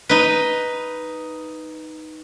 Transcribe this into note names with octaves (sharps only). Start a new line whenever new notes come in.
D#4 B4